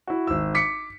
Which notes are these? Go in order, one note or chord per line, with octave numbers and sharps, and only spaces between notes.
E4 F#4
G#1 E6
D6 B6 C#7